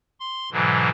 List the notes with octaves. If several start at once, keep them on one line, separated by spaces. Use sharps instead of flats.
C6
G#2 B2 D3 E3 F#3